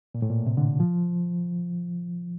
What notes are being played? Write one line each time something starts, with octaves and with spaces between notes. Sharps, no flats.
A#2
A2
A#2
C3
D3
F3